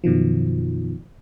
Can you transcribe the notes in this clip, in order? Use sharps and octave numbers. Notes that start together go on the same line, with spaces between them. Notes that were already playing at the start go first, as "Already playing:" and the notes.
F#2 B2 D#3 F3